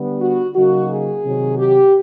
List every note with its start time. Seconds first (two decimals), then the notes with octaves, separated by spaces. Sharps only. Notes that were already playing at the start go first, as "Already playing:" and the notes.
Already playing: D3 G3 B3
0.21 F#4
0.54 C#3 F#3 A#3 D#4 F#4
0.90 G#4
1.24 C3 D#3 F#3
1.58 G4